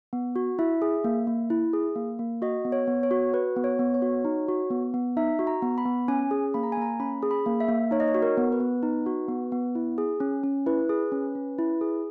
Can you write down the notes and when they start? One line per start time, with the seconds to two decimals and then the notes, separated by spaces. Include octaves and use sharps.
0.13 B3
0.36 F#4
0.59 E4 E5
0.82 G#4
1.04 A#3
1.27 A#3
1.50 E4
1.73 G#4
1.96 A#3
2.19 A#3
2.42 F#4 D#5
2.65 B3
2.72 C#5
2.87 B3
3.03 C#5
3.11 F#4
3.34 F#4 B4
3.56 B3
3.64 C#5
3.79 B3
3.94 C#5
4.02 F#4
4.25 D#4
4.48 F#4
4.70 B3
4.94 B3
5.17 D#4 E5
5.39 F#4
5.47 A#5
5.62 B3
5.78 B5
5.86 B3
6.08 C#4 G#5
6.31 G#4
6.54 A#3 B5
6.63 A#5
6.72 G#5
6.77 A#3 A#5
7.00 C#4 B5
7.22 G#4
7.31 B5
7.46 A#3
7.60 E5
7.69 A#3
7.91 D#4 C#5
8.00 D#5
8.08 C#5
8.15 F#4
8.22 A#4
8.37 B3
8.52 B4
8.60 B3
8.83 D#4
9.06 F#4
9.28 B3
9.52 B3
9.75 E4
9.98 G#4
10.20 C#4
10.43 C#4
10.66 E4 B4
10.89 G#4
11.12 C#4
11.35 C#4
11.59 E4
11.81 G#4